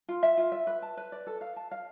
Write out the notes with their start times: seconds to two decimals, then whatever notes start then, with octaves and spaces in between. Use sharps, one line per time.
0.08 F4
0.23 E5
0.37 F4
0.52 E5
0.67 B4
0.82 A5
0.97 B4
1.12 D5
1.27 A4
1.41 F5
1.56 A5
1.71 F5